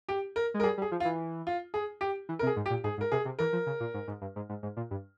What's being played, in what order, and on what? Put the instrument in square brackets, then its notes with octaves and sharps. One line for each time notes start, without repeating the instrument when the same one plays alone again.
[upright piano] G4
A#4
[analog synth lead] G#3
[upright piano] A#4
[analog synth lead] G3 [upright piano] G#4
[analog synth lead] G3
[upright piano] G#4
[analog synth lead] F3
[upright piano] F4
[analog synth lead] E3
[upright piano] F4
G#4
G4
[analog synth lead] E3
[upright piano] A#4
[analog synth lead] C3
[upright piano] G#4
[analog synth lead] G#2
[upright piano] G4
[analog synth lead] A#2
[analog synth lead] G#2 [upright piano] G#4
[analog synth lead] G#2
[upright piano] A#4
[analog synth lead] C3 [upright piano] G#4
[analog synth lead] C3
[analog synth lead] E3 [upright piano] A#4
[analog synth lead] F3
C#3
A#2
G#2
G#2
G2
G#2
G#2
G#2
A#2
G2